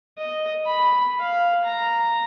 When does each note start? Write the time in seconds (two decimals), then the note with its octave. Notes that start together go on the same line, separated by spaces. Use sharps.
0.18 D#5
0.66 B5
1.19 F5
1.65 A#5